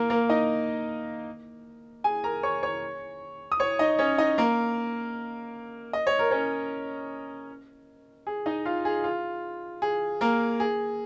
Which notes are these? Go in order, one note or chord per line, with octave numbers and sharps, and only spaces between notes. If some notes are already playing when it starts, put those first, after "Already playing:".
Already playing: A#3 A#4
A#3 A#4
D#4 D#5
G#4 G#5
A#4 A#5
C#5 C#6
C#5 C#6
D#6
C#5 C#6
D#4 D#5
C#4 C#5
D#4 D#5
A#3 A#4
D#5
C#5
A#4
C#4 C#5
G#4
D#4 D#5
F4 F5
G#4
F4
G#4
A#3 A#4
G#4